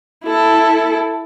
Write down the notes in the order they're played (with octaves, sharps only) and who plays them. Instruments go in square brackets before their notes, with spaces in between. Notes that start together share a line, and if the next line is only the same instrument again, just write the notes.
[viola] E4 A4